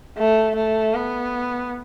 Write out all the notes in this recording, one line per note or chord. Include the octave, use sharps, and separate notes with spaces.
A3
A3
B3